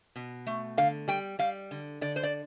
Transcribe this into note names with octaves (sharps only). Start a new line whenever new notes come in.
B2
A3
D3 F5
G3 G5
G3 F5
D3
D3 D5
C5
D5